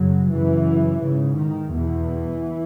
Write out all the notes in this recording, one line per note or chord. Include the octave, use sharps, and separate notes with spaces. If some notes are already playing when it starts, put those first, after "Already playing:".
Already playing: F#2 C#3 F#3
F#2 C#3 E3
G#2 C#3
D#3
E2 B2 E3